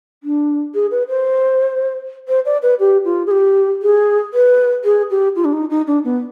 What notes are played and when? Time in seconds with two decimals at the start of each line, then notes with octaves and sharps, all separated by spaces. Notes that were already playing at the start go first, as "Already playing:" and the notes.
0.24 D4
0.75 G#4
0.91 B4
1.08 C5
2.28 C5
2.46 D5
2.63 B4
2.80 G4
3.05 F4
3.27 G#4
3.31 G4
3.82 G#4
4.34 B4
4.85 G#4
5.11 G4
5.36 F4
5.45 D4
5.53 D#4
5.70 D#4
5.87 D4
6.04 B3